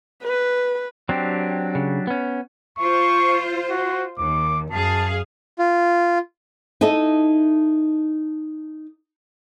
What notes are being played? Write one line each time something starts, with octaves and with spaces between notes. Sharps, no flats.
B4
F#3 C4 D4 G4
C#3
B3 C#4
F4 C5 C#6
F#4
D#2 D6
F#2 G#4 F5 A5
F4
D#4 E4 A4 D#5